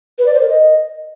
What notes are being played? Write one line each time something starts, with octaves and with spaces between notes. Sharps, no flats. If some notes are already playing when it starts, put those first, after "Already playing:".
B4
D5
C5
A#4
D#5